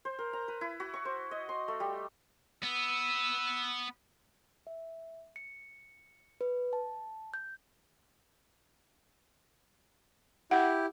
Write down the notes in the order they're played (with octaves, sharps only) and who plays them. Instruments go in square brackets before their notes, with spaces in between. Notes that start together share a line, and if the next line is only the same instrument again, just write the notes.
[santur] C5
A#4
A#5
B4
E4
F#4
C#6
C5
D#5
C6
A3
G3
[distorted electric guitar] B3 [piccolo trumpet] E6
[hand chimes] E5
C#7
B4
A5
G6
[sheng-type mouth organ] E4 G4 [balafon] F#5